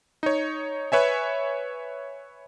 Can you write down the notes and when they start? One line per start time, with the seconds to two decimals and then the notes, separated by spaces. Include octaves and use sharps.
0.23 D#4 C#5
0.92 B4 C#5 E5 G#5